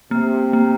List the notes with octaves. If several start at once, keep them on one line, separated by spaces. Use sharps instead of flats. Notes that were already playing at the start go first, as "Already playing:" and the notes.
C3 A#3
A#3